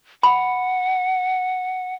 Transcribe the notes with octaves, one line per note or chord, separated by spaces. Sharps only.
F#5 B5